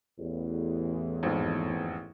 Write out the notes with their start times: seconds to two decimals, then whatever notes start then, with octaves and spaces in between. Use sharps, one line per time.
0.18 A1 E2
1.23 G#1 F2